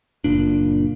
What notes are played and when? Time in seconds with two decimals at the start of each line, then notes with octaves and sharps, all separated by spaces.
0.24 F#1 A#2 D4